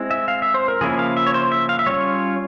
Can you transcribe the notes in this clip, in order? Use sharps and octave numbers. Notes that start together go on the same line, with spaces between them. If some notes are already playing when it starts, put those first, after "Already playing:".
Already playing: G#3 C4 E4
E5
F5
E5
C5
A#4
C#3 F3 A#3 C#4 E4 G#4
F5
E5
C#5
C5
E5
F5
E5
G3 C#4 F4 C#5